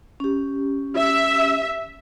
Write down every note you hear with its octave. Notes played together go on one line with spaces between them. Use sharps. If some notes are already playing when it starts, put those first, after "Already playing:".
C#4 G4
E5